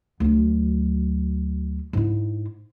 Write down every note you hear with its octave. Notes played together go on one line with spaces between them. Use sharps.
D2 F#3
G#2 E4